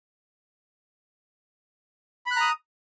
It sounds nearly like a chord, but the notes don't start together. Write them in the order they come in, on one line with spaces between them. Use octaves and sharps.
B5 F#6 A#5 D#6